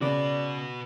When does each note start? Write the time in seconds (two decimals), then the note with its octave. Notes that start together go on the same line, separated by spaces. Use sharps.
0.01 C#3 F#4 B4 D5